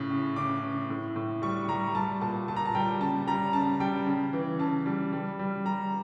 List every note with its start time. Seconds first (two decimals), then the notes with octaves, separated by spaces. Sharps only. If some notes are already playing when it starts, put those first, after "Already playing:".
Already playing: A2 C#3
0.11 C#3
0.36 C#3 D6
0.63 C#3
0.90 A2
1.16 A2
1.42 G3 C#6
1.69 G3 A#5
1.95 G3 A5
2.21 A#2 A5
2.48 A#2 A5
2.56 A#5
2.66 A5
2.75 G3 G5
3.00 C#3 A5
3.27 G3 A#5
3.53 C#3 A5
3.80 G3 G5
4.07 C#3
4.33 E3
4.59 C#3 A5
4.86 G3
5.13 G3
5.39 G3
5.65 G3 A#5